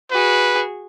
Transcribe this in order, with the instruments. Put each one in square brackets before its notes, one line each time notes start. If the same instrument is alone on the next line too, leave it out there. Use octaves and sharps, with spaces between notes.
[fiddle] F#4 G#4 [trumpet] B4